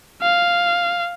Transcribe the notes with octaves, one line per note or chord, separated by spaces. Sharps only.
F5